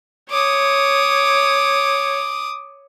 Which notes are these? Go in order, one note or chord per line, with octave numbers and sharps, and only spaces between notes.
C#5 D6 D#6